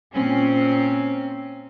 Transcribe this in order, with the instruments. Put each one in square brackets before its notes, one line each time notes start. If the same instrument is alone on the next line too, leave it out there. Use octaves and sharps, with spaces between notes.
[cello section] A#2 C4 C#4